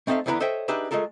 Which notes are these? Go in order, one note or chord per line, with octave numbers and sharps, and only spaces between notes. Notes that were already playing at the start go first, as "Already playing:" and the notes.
A3 C4 D#4 A4 E5 F5
E2 D3 B3 E4 B4 A#5
A4 C5 C#5 D#5 E5 G5
D4 D#4 G4 G#4 B4 E5
G#3 A3 F4 A4 A#4